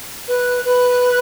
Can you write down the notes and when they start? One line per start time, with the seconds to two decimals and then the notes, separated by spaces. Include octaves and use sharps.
0.28 B4
0.64 B4